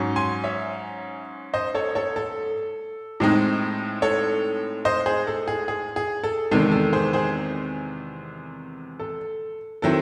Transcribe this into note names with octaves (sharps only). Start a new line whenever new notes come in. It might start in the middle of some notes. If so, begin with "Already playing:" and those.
Already playing: G#2 F#3 C#4
G#5 C6
C#5 E5
C5 D#5
A4 C#5
A4 C#5
A4
A2 G#3 C4 D#4
A4 C#5
C5 D#5
G#4 C5
A4
G#4
G#4
G#4
A4
E2 C3 D#3 G#3 A4
A4
G#4 C5
G#4 C5
A4
D#3 F#3 C4 E4 A4